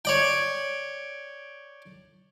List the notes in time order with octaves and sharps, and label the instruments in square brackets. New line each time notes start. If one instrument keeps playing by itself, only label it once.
[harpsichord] C#5 D5 G5